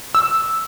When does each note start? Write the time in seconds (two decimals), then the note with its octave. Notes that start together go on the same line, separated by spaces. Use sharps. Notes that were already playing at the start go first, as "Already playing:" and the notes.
0.15 E6